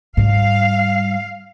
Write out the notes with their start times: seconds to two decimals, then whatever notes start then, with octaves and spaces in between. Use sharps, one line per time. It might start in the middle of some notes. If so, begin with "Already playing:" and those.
0.17 G#2 G3 F5